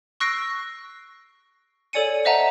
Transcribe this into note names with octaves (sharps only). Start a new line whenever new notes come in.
C#6 E6 F#6 A#6 C7 D7
A4 C#5 D5 G#5 C#7 D#7
C5 D#5 E5 F#5 A5 A#5